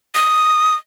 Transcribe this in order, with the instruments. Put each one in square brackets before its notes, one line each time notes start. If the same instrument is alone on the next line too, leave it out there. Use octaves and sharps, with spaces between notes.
[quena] D#6